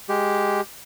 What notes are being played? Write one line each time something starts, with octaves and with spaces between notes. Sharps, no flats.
G#3 G4